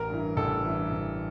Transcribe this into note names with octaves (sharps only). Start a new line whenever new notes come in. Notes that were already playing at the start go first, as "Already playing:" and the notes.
Already playing: A1 A#4
G2 E3
A1 A4
G2 E3
A1